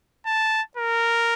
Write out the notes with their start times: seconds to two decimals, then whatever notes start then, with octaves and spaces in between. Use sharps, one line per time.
0.26 A5
0.77 A#4